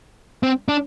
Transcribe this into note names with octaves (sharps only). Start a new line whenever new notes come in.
C4
D4